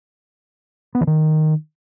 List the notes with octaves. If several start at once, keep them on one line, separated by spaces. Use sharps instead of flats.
B3
E3
D#3